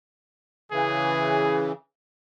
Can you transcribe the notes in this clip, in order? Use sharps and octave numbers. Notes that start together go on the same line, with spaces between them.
C#3 E3 G#4